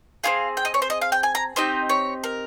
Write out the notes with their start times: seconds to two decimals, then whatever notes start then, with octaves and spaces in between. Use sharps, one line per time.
0.24 C4 F4 G#4 F5
0.57 G5
0.65 D#5
0.74 C#5
0.82 C5
0.90 D#5
1.01 F5
1.12 G5
1.23 G#5
1.35 A#5
1.56 C4 D#4 G4 D#5
1.89 C#5
2.24 A#4